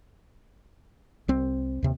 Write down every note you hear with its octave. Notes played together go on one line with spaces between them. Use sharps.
C2 C4
D#2 C3